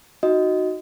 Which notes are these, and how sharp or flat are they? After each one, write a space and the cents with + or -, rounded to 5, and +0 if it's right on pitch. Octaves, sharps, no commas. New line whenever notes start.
D#4 +5 F#4 +0 D#5 +10